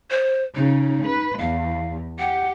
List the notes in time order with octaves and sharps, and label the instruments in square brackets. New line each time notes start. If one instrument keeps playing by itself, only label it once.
[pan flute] C5
[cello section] C#3 [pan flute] D#4
[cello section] B4
[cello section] E2 [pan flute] F5
[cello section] G4 [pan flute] F#5